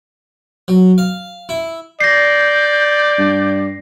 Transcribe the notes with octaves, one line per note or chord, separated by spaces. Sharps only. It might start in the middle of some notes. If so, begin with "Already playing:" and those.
F#3
F5
E4
D5 G6 A#6 C7
G2